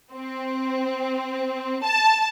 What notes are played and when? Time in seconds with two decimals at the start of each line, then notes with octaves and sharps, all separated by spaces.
0.14 C4
1.83 A5